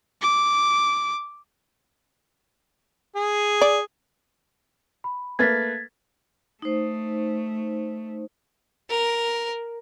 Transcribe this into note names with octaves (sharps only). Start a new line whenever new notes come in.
D6
G#4
D5
B5
A3 A#3 B4 G#6 A6 B6
A3 D#4 C5
A#4